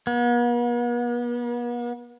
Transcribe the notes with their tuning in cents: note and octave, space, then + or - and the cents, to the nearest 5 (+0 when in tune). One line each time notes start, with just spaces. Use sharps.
B3 -45